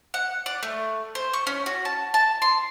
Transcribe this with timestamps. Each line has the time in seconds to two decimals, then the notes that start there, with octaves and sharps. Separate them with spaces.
0.14 F#5
0.46 D5
0.63 A3
1.15 C5
1.33 C#6
1.47 C#4
1.66 F#4
1.85 A5
2.14 A5
2.42 C6